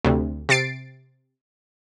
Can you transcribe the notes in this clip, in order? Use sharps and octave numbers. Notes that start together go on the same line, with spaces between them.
D2 C3
C3 A6 C7 D7